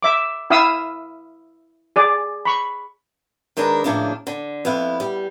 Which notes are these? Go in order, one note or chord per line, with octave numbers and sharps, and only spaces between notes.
E5 D6
E4 E5 F5 D#6 E6
G#4 D5
B5 C#6
D#3 G#3 D4 A#4 B4
A2 C#3 F3 A#3 D4
D3
F2 B3 E4 F5
G3